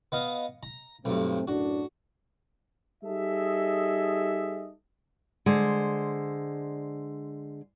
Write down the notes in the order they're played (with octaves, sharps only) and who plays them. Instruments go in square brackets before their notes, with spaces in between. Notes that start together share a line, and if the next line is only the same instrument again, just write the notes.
[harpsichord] B3 D#5 F5
A#5
[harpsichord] B1 G2 [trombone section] A3 C4
[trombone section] F#2 A2 D4 [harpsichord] F#4
[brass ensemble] G3 D#4 G#4 A4 D#5 E5
[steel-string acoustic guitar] D3 G#3 C5